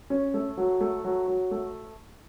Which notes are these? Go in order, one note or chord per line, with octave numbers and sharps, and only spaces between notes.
C#4
A3
F#3
A3
F#3
F#3
A3